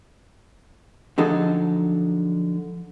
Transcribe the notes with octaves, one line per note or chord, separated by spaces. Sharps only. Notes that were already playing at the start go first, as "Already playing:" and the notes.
D3 F3 F#3 D#4 G#4 A4